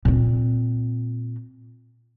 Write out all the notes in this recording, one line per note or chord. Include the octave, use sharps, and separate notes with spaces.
A#2 C4